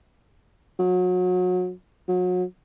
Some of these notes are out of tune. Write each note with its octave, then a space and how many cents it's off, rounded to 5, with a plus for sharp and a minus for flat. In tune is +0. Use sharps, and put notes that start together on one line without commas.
F#3 -30
F#3 -35